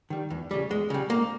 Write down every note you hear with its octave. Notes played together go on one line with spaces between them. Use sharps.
D#3 G3
E2
C#3 G3
E2 G#3
C#3 G3
G#2 A#3